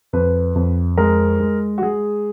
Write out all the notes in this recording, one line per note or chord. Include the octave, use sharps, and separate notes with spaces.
F2 B4
F2
G#3 A#4
G#3
F#4
G#3 G#4